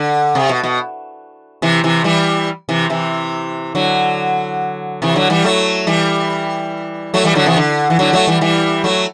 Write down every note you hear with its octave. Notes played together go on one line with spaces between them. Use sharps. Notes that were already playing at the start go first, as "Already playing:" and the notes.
Already playing: D3
C3
B2
B2
C3 E3
C3 E3
E3 G3
C3 E3
C3 E3
D3 F#3
C3 E3
D3 F#3
E3 G3
F#3 A3
E3 G3
F#3 A3
E3 G3
D3 F#3
C3 E3
D3
E3
D3 F#3
F#3 A3
E3 G3
E3 G3
F#3 A3